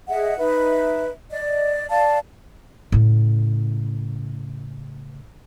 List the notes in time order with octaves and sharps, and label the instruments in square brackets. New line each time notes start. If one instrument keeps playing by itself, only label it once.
[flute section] G#4 D#5 E5 F#5
D#4 B4 E5
D5 D#5
D5 F5 A5
[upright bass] A2 C#3